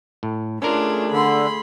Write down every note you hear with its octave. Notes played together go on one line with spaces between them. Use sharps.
A2
A3 C#4 D4 F4 G#4 A#4
D3 B5 C6